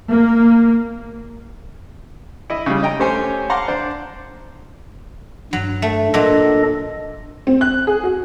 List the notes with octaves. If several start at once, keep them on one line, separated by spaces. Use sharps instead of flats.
A#3
E4 D#5
C#3 G3
D#5 G5 A#5
A3 C#4 G4 C5 C#5 G#5
F5 F#5 A5 A#5 C6 D6
D4 C5
G2 F#3
A3
A#2 F#3 D4 A4 D#5
C4
F#6
G#4
F#4